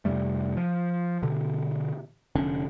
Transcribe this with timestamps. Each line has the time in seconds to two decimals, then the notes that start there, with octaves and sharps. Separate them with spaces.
0.05 F2 C3 G3 A3
0.57 F3
1.23 B2 D3
2.35 F1 D3 C#4